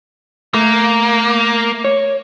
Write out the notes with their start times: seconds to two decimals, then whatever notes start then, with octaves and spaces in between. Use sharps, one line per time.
0.54 A3 A#3
1.84 C#5